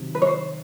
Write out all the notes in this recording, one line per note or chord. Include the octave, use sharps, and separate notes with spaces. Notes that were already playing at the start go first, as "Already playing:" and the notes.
Already playing: C3 D#3 F#3
B4
C#5
C5